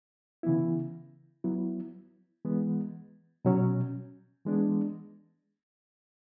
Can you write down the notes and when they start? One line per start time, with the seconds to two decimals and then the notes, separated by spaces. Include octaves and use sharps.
0.43 C#3 E3 B3 E4
1.44 F#3 B3 E4
2.45 E3 G#3 B3
3.45 B2 F#3 C#4
4.45 E3 G#3 B3 D4